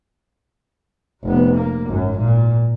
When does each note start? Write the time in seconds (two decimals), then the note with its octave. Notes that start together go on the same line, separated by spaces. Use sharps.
1.23 F1 B3
1.54 A#3
1.87 G#1 F#2
2.17 A#2